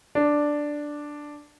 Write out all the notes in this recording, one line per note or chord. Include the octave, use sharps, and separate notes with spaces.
D4